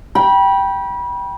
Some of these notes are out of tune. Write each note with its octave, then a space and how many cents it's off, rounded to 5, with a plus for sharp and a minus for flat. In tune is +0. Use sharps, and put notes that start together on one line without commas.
G5 +0 B5 -30